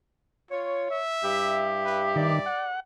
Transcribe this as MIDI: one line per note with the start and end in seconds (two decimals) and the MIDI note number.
0.51 0.89 65
0.51 0.99 73
0.91 1.73 76
1.23 2.46 43
1.23 2.46 64
1.23 2.46 67
1.85 2.04 71
2.16 2.39 51
2.16 2.70 74
2.46 2.80 78